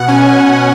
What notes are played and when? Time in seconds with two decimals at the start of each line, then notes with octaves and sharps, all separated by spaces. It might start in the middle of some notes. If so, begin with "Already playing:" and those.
Already playing: B2 F#5
0.08 C#4 G#5